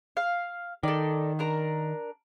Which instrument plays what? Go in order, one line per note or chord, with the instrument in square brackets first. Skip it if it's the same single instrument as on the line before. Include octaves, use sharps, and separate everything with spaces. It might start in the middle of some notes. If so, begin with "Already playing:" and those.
[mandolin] F5
[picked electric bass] D#3 [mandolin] A4 D5
[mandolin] D4 A#4 A#5